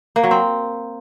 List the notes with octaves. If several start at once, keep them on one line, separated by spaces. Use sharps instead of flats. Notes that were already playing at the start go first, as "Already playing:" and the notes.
A#3
F#3
C4